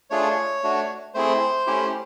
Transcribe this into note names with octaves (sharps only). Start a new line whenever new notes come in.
A3 D4 F4 G#4 C#5
A3 D4 F#4
A3 C4 E4 G#4 C5
A3 C#4 E4 G4